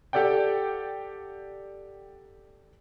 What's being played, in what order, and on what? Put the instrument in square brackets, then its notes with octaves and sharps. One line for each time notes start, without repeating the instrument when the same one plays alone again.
[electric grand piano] G4 A4 D5 F#5 G5